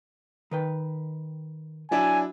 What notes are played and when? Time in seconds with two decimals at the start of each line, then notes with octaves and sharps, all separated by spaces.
0.51 D#3 B4 G5
1.91 F#3 D4 E4 G#5